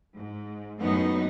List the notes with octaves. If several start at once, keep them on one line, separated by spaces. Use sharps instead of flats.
G#2
F#2 A2 B3 D#4